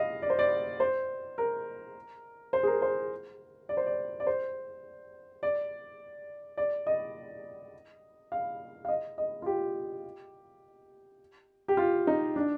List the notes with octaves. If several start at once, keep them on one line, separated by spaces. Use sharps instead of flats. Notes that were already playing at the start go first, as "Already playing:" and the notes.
Already playing: D#5 F5
D5
C5
D5
C5
A#4
C5
G#4
A#4
C5
D5
C5
D5
D5
C5
D5
D5
D#5
F5
F5
D#5
D#5
F4
G4
G4
F4
D#4
D4